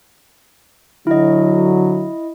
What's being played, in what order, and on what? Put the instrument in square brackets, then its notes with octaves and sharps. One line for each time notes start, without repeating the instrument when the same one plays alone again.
[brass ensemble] D3 F#3 [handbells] E4 D#5